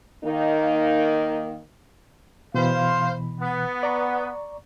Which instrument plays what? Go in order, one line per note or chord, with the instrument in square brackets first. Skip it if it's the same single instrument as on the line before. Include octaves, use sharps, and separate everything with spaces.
[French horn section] D#3 A#3 D#4
[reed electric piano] B2 E3 B5 [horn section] C5 F5
[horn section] B3
[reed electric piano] D5 A#5 C#6